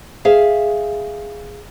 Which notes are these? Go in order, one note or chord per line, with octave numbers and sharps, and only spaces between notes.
G#4 E5 F5